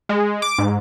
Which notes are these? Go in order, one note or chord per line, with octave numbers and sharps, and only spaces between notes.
G#3
D6
G#2